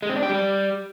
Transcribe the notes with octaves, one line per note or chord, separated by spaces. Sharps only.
G#3
C4
D4
G4
G3